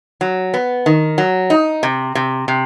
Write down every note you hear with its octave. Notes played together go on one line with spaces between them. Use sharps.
F#3
B3
D#3
F#3
D#4
C3
C3
C3